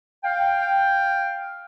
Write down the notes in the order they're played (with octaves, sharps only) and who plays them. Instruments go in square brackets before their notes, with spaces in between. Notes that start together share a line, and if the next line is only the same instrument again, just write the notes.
[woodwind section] F5 G5